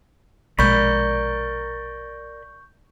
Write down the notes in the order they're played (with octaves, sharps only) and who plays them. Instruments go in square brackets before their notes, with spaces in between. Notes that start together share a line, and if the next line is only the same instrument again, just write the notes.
[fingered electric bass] A#1 B2 G#3 [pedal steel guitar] A#4 D5 B5 [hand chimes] C#6 G6